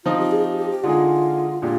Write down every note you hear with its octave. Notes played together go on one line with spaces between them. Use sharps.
F3 C4 D#4 F4
G4
G#4
G4
G4
G4
D3 G#3 D#4 F4 G#4
A#2 G#3 D4 F4 G4